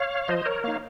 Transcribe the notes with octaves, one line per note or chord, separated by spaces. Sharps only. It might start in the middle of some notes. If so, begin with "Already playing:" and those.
Already playing: C#5 F5
F3 C5 D#5
A#4 C#5
A#3 D#4 C#5 F5